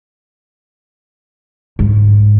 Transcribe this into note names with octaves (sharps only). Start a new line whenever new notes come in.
G#2